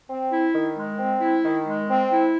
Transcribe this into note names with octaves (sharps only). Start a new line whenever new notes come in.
C4
E4
D#3
G#3
C4
E4
D#3
G#3
C4
E4